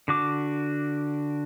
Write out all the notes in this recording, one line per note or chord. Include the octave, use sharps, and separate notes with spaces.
D3 F#4 D6